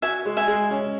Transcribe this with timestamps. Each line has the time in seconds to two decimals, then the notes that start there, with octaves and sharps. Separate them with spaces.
0.02 F#4 E5 G#5
0.26 G#3
0.37 E5 G#5
0.48 G#3
0.71 C#4